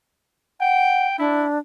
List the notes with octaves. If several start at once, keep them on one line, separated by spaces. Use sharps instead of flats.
F#5 G5
D4 E4